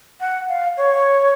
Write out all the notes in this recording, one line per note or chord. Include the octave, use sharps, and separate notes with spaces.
F#5
F5
C#5